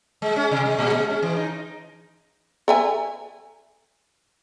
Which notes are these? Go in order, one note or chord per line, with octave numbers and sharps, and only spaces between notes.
G#3
C#4
C3
G#3
A#2
G#3
C#4
E3
D#4
A4 E5 G#5